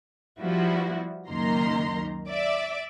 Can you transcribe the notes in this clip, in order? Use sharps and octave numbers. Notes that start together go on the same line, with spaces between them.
F3 G3 B3 E4 F#4
C#2 F#2 D#3 A#3 A#5 C6
D5 E5 D6